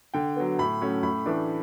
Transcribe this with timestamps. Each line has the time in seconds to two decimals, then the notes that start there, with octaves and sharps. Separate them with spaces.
0.14 D3 G5
0.36 F#3 B3
0.59 A2 B5
0.81 F#3 A3 C#4
1.03 A2 B5
1.26 E3 A3 D4